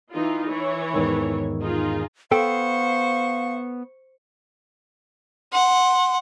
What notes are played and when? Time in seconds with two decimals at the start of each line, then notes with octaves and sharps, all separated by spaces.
0.12 E3 D#4 F4
0.47 E3 C#5
0.94 E2 G#2 D#3
1.62 D#4 F4 G#4
2.31 B3 A4 C5 F5 G5 C#6
5.53 F#5 C6